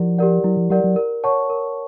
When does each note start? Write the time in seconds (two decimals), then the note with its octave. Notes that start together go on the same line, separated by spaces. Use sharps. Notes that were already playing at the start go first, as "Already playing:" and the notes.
Already playing: F3 E4 G4 A#4 D5 F#5
0.18 G4 A#4 D5 F#5
0.44 F#3 E4
0.57 F3
0.70 F#3 G4 A#4 D5 F#5
0.84 F#3
0.96 A#4
1.24 C#5 F#5 A5 C#6
1.50 A#4